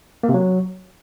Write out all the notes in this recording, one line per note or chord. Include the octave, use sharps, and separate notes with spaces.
A#3
C3
F#3